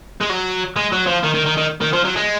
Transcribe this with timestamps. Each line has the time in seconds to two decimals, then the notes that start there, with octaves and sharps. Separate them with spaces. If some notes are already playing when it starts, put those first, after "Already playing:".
0.21 G#3
0.29 F#3
0.76 G#3
0.93 F#3
1.07 F3
1.24 D#3
1.35 D#3
1.46 D#3
1.58 D#3
1.81 D#3
1.93 F3
2.05 F#3
2.16 G#3